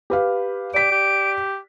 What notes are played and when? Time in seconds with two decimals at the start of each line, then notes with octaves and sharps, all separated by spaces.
0.10 G4 B4 F5
0.74 G4 D5 B6 D7
0.91 G4